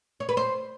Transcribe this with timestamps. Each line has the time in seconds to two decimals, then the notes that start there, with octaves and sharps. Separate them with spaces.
0.20 C#5
0.29 B4
0.37 C5